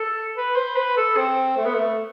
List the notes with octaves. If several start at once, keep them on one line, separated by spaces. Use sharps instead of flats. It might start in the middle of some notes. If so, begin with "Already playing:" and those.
Already playing: A4
B4
C5
B4
A4
C4
A3
B3
A3